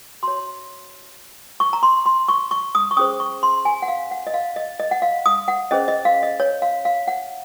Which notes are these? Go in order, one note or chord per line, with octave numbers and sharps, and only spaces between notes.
F#4 C#5 C6
C#6
A#5
C6
C6
C#6
C#6
D#6
C#6
C#4 G#4 C5 D#6
C#6
C6
G#5
F#5
F5
F#5
D#5
F5
D#5
D#5
F#5
F5
D#6
F#5
C#4 G#4 C5 D#5
D#5
F5
D#5
C#5
F5
F5
F#5